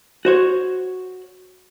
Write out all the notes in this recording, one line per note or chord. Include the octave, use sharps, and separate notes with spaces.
F#4 C5 C#5